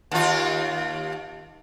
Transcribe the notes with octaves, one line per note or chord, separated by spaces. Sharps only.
D#2 F4